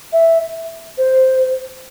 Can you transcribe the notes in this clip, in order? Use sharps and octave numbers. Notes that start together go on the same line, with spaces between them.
E5
C5